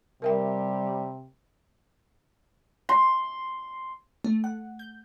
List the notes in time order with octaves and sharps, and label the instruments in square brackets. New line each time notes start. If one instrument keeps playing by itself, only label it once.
[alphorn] C3 [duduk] G3 [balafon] A#4 E5 G5
[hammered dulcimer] C6
[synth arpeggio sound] A3
F#5
G6